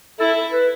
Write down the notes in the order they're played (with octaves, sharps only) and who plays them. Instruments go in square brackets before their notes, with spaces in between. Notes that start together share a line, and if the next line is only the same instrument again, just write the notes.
[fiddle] E4 [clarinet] A4
[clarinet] B4